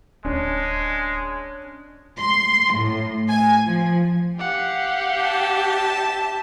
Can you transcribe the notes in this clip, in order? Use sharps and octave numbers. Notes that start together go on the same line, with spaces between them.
D1 G#3 C#4 D4
C6
A2
G#5
F3
G4 F5 F#5
E5 A5